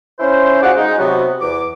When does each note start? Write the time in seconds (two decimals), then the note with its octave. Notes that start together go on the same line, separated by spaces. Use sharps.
0.19 C#4 E4 C5
0.63 F4 F#4 G#4 C5 D5 F#5
0.76 G#3 D#4
0.98 C3 F#3 B3 F#4
1.40 E2 D6